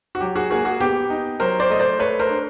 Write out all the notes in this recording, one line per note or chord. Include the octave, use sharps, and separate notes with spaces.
F#4
F#3 G4
F#4 G#4
A#3 F#4 G#4
F#4 G#4
B3 G4
D#4
F#3 A#4 C5
C5 D5
A3 D#5
C5 D5
A3 B4 C#5
A#4 C5
D4